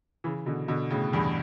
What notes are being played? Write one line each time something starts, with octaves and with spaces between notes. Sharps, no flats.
C#3 E3
B2 D3
B2 D3
A2 C#3
E2 G2